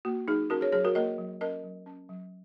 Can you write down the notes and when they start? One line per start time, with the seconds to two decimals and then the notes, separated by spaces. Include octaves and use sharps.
0.05 A#3 F#4
0.28 F#3 D#4 G#4
0.50 C#4 F#4 A#4
0.61 G#4 C#5
0.72 F#3 G#4 C#5
0.84 F#4 A#4
0.95 A#3 A#4 D#5
1.18 F#3
1.41 C#4 A#4 D#5
1.64 F#3
1.86 C#4
2.09 F#3